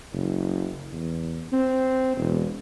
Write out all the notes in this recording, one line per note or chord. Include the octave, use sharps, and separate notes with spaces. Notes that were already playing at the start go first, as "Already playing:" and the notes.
F#1
E2
C4
E1